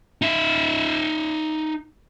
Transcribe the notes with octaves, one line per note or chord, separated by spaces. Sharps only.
D#4 E5